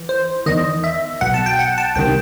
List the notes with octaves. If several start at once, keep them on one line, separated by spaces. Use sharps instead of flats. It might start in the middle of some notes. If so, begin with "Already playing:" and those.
Already playing: E3
C5
E2 D#3 D#5
E5
B1 B2 F#5
A5
G5
F#5
A5
C2 C3 D#3 G5